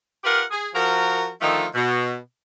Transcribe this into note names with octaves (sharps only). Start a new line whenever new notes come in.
F4 G4 A#4 B4 F5 F#5
G#4
F3 F#4 A#4
D3 D#3 F3 A3 D#4 F4
B2